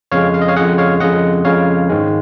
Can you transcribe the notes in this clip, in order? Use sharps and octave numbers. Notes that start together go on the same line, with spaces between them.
F2 C#3 G#3 C#5 F5
F5
D#5
C#5 F5
F2 C#3 G#3 D#5 F#5
C#5 F5
F2 C#3 G#3 D#5 F#5
F2 C#3 G#3 C#5 F5
G#2 D#3 G#3